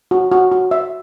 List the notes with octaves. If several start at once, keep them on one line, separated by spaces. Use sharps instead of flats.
F#4
F#4
F#4
E5